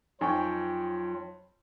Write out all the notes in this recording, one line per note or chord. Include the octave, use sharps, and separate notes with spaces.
F2 F#3 D#4 F4 G5 G#5 C#6